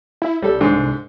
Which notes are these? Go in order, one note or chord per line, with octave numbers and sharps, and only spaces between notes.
E4
C2 G3 A4
G#2 D3